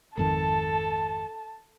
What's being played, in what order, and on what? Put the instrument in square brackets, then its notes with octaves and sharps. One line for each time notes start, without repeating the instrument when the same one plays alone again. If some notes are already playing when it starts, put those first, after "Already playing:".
[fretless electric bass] G#1 F2 D#3 [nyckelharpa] A4 [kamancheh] A5